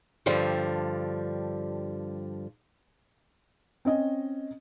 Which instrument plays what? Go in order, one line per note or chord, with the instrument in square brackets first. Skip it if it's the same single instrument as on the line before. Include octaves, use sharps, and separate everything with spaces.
[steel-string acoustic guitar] G2 D3 F3 G3
[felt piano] C4 C#4 D#5